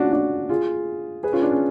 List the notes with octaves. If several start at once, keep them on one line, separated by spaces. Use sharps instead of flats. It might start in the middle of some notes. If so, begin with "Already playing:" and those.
Already playing: C#4 D4 F4 F#4
D4 F#4
F4 G#4
G#4 B4
C#4 F4
D4
C#4